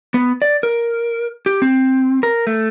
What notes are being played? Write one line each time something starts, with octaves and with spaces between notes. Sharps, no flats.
B3
D5
A#4
G4
C4
A#4
A3